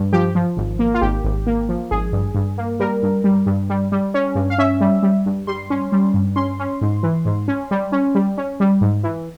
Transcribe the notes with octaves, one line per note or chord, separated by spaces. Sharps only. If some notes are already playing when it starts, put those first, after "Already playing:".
Already playing: G2
F3 G4
F3
G#1
A#3
F4
G#1 G4
G#1
A#3
F3
G#1 G#4
G2
G2
A#3
G3 A#4
G2
G3
G2
G3
G3
C#4
G2
F5
C#4 E5
G3
G3
G2
G3 C6
C#4
G3
G2
C#4 C6
C#4
G#2
E3
G#2
C#4
G3
C#4
G3
C#4
G3
G#2
E3